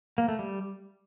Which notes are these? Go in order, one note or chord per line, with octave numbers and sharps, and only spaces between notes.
A#3
A3
G3